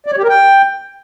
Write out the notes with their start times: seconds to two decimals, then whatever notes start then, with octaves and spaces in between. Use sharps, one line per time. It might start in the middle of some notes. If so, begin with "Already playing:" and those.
0.06 D5
0.12 C#5
0.18 G4
0.23 A#4
0.29 G5